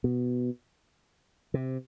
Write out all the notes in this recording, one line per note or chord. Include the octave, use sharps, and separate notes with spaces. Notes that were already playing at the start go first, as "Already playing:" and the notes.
B2
C3